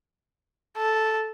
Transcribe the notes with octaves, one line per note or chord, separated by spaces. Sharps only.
A4